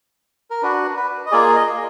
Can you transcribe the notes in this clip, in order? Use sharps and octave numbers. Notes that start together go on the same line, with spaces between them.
A#4
D4 F#4 B4
B4
D#5
A#3 F4 G#4 D5
D#5